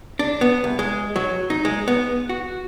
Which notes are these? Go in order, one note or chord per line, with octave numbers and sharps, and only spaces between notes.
D4
B3
C2
G#3
F#3
D#4
G#3
B3
F#4